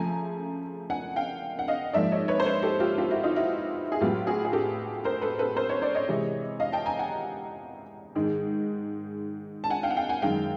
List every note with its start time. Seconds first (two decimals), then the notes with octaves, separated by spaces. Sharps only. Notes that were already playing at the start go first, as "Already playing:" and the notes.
Already playing: C#3 F3 A3 G#5 A#5
0.90 F#5 G#5
1.16 F5 G5
1.59 F#5
1.68 D#5 F5
1.93 G#2 F3 A#3 D5 E5
2.12 C#5 D#5
2.28 B4 C#5
2.40 C5
2.46 B4 C#5
2.63 G4 A4
2.80 F4 G4
2.98 F4 G4
3.11 E4 F#4
3.24 D#4 F4
3.36 E4 F#4
3.92 G#4
4.01 A2 F#3 B3 F4 G4
4.27 F#4 G#4
4.45 G#4
4.53 G4 A4
5.04 A#4 C5
5.21 A4 B4
5.39 A4 B4
5.56 A#4 C5
5.69 B4 C#5
5.82 C5 D5
5.95 C#5 D#5
6.09 C3 E3 G#3
6.60 D#5 F5
6.72 G5 A5
6.86 G#5 A#5
6.99 F#5 G#5
8.15 G#2 D#3 G#3
9.64 A5
9.70 F#5 G#5
9.83 F5 G5
9.91 F#5
9.97 F5 G5
10.09 F#5 G#5
10.22 F#2 D#3 G#3 F5 G5